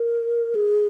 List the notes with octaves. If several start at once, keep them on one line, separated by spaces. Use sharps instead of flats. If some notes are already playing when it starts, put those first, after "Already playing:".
Already playing: A#4
G#4